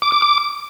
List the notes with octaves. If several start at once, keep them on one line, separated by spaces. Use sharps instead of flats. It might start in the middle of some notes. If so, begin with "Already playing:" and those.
D6
D6
D6